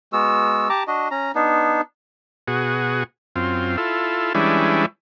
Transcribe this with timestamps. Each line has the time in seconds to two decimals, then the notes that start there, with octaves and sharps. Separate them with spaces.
0.13 G#3 B3 F#4 E6
0.69 G4 A5 A#5 D6
0.88 D4 F#4 D#5
1.11 C#4 A#5
1.35 B3 D4 D#4
2.48 B2 F#4 G#4
3.36 F#2 C4 F4
3.77 E4 F4 A4
4.35 E3 G3 G#3 C#4 D4 E4